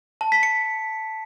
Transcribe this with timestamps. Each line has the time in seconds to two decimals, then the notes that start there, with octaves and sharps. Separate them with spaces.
0.21 A5
0.32 B6
0.43 C#7